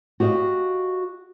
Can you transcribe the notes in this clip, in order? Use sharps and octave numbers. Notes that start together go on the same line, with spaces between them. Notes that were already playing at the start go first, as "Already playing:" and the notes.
F#4 G4 D#5 F5